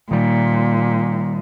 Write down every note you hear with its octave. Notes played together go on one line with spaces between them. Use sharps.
A#2 D#3 G3